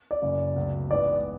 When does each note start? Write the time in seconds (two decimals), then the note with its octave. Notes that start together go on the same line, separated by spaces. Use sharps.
0.11 D5
0.22 F#1 F#2 C#3
0.56 C#2 B2 F#3 A3
0.90 A1 G#2 E3 B3 D5